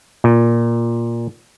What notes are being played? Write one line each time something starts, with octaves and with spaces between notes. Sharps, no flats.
A#2